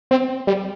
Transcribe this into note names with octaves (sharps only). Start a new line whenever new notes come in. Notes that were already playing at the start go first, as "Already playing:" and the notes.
C4
G3